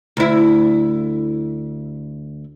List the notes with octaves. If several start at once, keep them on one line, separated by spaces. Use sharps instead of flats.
D2 E4